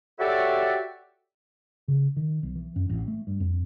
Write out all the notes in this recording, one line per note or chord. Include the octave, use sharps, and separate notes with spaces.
F#4 G4 A4 C#5 D5 E5
C#3
D#3
B1
E3
F#2
A1
A3
G2
F2